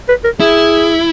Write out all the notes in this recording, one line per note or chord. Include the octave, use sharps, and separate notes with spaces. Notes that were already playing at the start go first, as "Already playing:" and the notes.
B4
A#4
E4 G#4